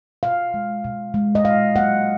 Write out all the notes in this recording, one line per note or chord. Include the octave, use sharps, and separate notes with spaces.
B2 F5
G#3
B2
G#3
D#5
A#2 F5
F#3 A#3 F#5